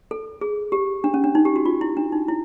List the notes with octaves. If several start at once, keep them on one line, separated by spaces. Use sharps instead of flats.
A4
G#4
G4
D4
C#4
D4
D#4
G4
F#4
F4
E4
D4
D#4
E4